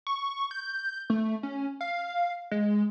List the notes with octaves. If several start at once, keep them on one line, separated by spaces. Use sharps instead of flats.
C#6
G6
A3
C#4
F5
G#3